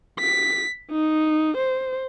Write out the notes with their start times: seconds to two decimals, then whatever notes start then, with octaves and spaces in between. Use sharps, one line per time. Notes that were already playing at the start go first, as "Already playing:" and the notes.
0.19 B6
0.92 D#4
1.57 C5